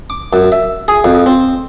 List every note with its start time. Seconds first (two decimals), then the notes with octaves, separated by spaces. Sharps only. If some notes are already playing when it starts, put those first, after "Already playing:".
0.10 D6
0.33 F#2
0.52 E5
0.88 G#4
1.04 F2
1.26 C4